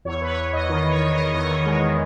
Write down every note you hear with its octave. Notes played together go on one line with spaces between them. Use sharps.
E2 C#5
E2 B4
C#5
E2
E2 D#5
D#5
D#3
D#5
D#3 C#5
D#3 C#5
D#3 D#5
C#5
E2 D#5
D#3 C#5
D#5
G#3 C#5
D#3